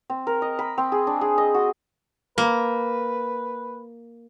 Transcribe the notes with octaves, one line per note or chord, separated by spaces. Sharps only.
C4
A#4
D#5
B5
C4
G#4
D4
G#4
D#5
F#4
A#3 B4